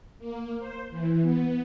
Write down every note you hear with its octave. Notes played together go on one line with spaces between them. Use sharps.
A#3
C5
E3
B3